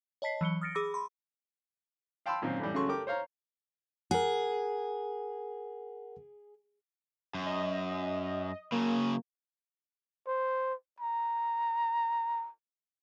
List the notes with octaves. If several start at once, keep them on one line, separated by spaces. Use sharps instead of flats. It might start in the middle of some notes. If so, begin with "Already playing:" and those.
C#5 D#5 A5 B6 C7
E3 F#3 C#7 G7
D#6 F6 A6 A#6 C#7 D7
G#4 B5 D6 E6 A#6
B5 C6
F5 G5 A5 B5 C6 E6
F#2 A#2 D#3 C4
A2 E3 G3
F#2 C#3 A3 F#4 C6 C#6
A3 G4 A#4 G5 D6
C5 C#5 F5 A#5
G#4 A#4 F#5
F#2
D#5
C#3 F#3 A#3
C5
A#5